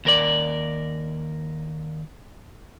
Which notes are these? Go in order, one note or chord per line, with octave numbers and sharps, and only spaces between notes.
D#2 A#4 D5